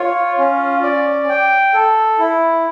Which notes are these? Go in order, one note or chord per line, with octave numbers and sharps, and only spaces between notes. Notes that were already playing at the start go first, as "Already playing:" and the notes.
Already playing: F4 C#5
C#4
D5
G5
A4
E4